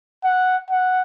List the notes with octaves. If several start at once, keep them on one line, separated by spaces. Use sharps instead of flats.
F#5
F#5